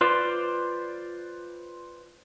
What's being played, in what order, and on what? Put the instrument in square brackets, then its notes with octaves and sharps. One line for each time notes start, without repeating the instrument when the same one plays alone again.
[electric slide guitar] F4 B4 C5 D5